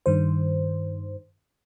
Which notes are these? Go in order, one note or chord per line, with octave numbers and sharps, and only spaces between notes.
G2 D#3 C5